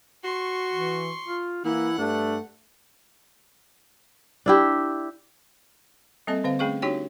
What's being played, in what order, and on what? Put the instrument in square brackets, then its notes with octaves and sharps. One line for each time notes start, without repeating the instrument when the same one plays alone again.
[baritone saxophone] F#4 [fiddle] C6 C#6
[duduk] E3
F4
[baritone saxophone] E3 [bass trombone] A#3 [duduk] E4 [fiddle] F#5 F#6
[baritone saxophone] G2 [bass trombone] A3 [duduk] D4
[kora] D4 E4 G4
[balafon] G3 A#3 C4 A4 D#5
D3 C4 C5 F5
A3 C#4 G#4 F5 C#6
D4 D#4 F#4 G4 C#5 G5